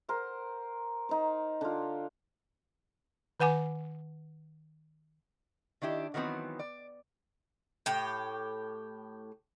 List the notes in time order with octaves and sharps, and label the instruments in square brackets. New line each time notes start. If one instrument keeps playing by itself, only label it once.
[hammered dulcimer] A#4 C5 F#5
D#4 C5
D3 F4
[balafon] D#3 B4 F#5 G#5 D6
[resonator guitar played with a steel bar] D#3 D4 E4 G4
D#3 E3 F#3 B3 C4
D5
[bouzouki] A2 G4